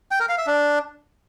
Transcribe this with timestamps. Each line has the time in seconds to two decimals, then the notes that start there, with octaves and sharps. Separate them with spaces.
0.11 G5
0.20 A#4
0.29 F5
0.38 E5
0.47 D4